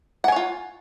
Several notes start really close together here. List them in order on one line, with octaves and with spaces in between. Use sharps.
F#5 G#5 C#5 F4